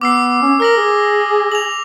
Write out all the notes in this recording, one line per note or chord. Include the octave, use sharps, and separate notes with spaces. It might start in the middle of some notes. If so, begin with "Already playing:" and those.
B3 D6 E6 C7
C#4
A#4 F6 A#6 F#7
G#4
F7 F#7